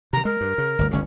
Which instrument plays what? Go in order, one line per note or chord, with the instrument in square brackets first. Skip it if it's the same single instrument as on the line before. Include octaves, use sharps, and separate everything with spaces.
[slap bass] C3 D#3 [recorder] A#5
[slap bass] G#3 [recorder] A#4
[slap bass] G2
C#3
G1 D2
[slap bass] G1 C#2 D3 [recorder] C#4